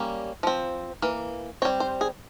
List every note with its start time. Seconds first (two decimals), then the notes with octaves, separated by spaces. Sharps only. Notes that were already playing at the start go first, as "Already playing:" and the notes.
Already playing: G3 A#3 C#4
0.43 F3 C4
1.02 E3 A#3
1.62 C4 C#5
1.65 G3
1.80 C5
2.01 G#4